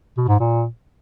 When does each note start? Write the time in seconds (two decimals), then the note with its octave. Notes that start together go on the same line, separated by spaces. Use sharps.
0.17 B2
0.28 G#2
0.40 A#2